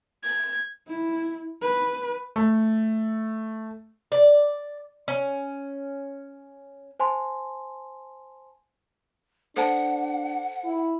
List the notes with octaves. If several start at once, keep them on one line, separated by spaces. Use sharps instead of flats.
G#6
E4
B4
A3
D5
C#4
C5 G#5 A5 C6
D4 A4 C5 F#5 A5
E4